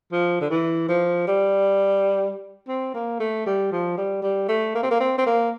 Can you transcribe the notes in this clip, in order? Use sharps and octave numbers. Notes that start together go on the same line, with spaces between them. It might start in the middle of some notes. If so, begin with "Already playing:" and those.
F3
D3
E3
F3
G3
C4
A#3
A3
G3
F3
G3
G3
A3
A#3
C4
A#3
C4
C4
A#3